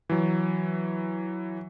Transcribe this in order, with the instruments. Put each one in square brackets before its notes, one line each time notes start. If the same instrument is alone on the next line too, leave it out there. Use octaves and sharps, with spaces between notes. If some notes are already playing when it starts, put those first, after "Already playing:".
[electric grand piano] E3 F#3